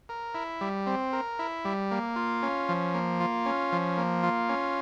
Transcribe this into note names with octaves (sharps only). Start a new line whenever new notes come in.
A#4
E4
G3
C4
A#4
E4
G3
A#3
F4
C#4
F3
A#3
F4
C#4
F3
A#3
F4
C#4